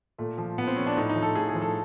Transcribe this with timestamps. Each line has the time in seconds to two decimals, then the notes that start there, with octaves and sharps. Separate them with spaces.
0.18 A#2 A3
0.38 F3
0.58 A#2 B3
0.67 C4
0.77 F3 C#4
0.87 D4
0.97 A2 D#4
1.09 D#4
1.16 F3
1.22 A4
1.35 A2 G#4
1.49 G#4
1.55 F3
1.62 A4